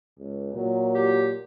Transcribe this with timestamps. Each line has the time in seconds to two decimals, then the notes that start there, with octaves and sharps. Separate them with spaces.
0.18 C#2
0.54 A#2 F#3
0.94 G4